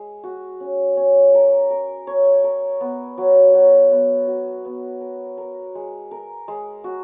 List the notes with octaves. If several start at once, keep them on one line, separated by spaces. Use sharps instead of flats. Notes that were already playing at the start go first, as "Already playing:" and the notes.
Already playing: G#3
F#4
C#4
C#4
A#4
A#4
C#5
A#4
B3
F#3
F#3
B3
F#4
B3
A#4
A#4
G#3
A#4
G#3
F#4